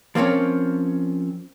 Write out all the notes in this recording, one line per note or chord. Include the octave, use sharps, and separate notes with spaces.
F3 A#3 C4 C#4 C#5